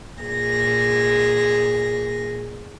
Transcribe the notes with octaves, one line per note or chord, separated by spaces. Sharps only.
A#2 G#4 A#6